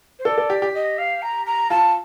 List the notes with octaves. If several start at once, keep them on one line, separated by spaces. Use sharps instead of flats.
C5
A4 D5
A4
G4
G4
D#5
F5
A#5
A#5
F4 A5